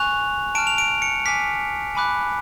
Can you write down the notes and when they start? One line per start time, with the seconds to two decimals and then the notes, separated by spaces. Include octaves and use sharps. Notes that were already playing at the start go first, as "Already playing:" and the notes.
Already playing: G#5 C#6 F#6 F7
0.55 A5 F6 D7
0.67 F7
0.78 D7
1.02 C#7
1.25 G#5 D6 F6 B6
1.95 G#5 B5 D6 F#6